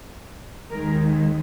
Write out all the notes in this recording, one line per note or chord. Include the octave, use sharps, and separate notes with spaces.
D#2 D#3 G#3 A#4